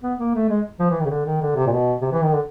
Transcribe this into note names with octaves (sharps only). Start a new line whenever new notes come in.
B3
A#3
A3
G#3
F3
E3
D#3
C#3
D3
D#3
D3
C3
A#2
B2
C3
E3
D#3
D3